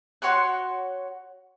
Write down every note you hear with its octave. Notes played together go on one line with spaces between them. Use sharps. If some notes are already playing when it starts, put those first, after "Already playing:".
F#4 C#5 C6 F#6